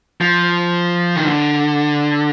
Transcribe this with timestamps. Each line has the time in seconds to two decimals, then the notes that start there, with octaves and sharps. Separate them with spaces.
0.21 F3
1.15 D#3
1.26 D3